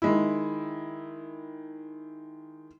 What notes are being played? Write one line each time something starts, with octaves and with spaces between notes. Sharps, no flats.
D#3 G#3 E4